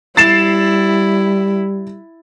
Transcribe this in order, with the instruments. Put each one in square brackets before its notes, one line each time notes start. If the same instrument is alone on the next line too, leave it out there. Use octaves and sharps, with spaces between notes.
[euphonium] G3 [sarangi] E4 [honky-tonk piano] A6 C7 E7